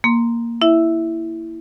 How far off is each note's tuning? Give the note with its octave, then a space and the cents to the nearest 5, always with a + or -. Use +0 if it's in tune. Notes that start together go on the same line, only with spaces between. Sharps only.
A#3 +0 C6 -10
E4 +0 E5 +0